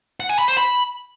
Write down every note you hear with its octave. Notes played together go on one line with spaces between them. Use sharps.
F#5
G#5
B5
C5
B5